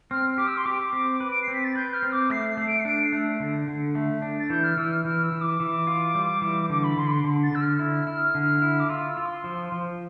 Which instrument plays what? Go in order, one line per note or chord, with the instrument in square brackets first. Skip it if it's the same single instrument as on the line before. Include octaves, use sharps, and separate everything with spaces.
[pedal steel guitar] C4 [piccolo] F6
[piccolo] F6
[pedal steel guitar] G4 [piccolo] D6
[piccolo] E6
C6
[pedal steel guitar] G4 [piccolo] D6
[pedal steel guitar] C4
B4
[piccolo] D7
C7
[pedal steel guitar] C4
[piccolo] B6
A6
[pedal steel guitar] B4 [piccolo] G6
[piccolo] F6
[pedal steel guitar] C4
[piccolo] D6
[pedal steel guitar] A3 [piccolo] C7
[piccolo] C7
[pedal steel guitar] A3
[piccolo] D7
C7
[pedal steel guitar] D4 [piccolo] D7
[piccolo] C7
[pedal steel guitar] A3
D3
D3
A3
D4
[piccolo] A6
[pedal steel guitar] E3 [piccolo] G6
[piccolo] F6
[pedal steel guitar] E3 [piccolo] E6
[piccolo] F6
[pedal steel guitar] E3 [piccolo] F6
[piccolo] E6
[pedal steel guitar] E3
[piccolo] D6
[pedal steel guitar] E3
F4
G3
E3
[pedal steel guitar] D3 [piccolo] D6
[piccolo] B5
[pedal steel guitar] D3 [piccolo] C6
[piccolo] B5
C6
[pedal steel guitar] D3
[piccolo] A6
[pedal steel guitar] D3 [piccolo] E6
[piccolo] F6
[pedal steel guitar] E4
E4
D3
E4
[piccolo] D6
[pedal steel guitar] F4 [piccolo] E6
[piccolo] E6
[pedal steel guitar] F4
[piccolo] C6
[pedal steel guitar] F3
F3